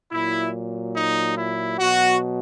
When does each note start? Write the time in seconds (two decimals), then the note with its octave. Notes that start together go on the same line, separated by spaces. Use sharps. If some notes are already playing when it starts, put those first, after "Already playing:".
0.12 A#2 F#3 E4
0.94 D#4
1.36 E4
1.79 B2 F#3 F#4